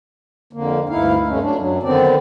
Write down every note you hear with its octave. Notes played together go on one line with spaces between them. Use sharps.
F2 D3 A#3
D2 G2 D#4 E4 F5
G2 C3 G#3 A3 C#4
F#3 D4
F#2 F#3
D3 D#3 B3 C4 D5